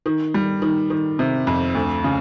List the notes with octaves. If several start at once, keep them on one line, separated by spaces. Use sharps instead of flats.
D#3
G3
D#3
D#3
C3
F2
D2
C#3